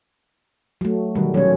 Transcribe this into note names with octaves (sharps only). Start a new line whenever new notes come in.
F#3 A3
B2 D#3 F#3 G3
D#1 F#3 C#4 C#5 C#7